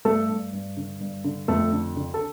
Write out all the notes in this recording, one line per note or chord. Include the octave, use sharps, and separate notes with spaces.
G2 A3 A4
G2
G2
D3
G2
D3
F2 A3 A4
D3
D3
A4